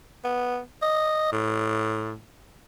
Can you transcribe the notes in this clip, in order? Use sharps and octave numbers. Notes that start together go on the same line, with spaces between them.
B3
D#5
A2